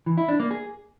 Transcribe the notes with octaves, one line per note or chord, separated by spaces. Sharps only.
E3
E4
D4
A#3
G#4